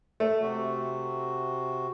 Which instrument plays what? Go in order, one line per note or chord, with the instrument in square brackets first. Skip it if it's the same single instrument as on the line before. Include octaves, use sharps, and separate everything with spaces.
[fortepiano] A3
[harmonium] C3 F#4